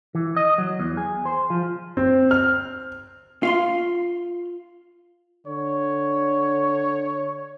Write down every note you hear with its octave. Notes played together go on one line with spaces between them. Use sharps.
E3
D#5
F#3
E2
G#4
C5
F3
C4
F6
F4 F5 C6
D3 C#5